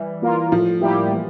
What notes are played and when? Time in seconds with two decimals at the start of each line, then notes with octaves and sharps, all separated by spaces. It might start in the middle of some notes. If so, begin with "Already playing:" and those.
Already playing: E3 G3
0.22 A#3 F4 A#4
0.52 A2 F3
0.81 G3 A#3 E4 G4
1.11 E3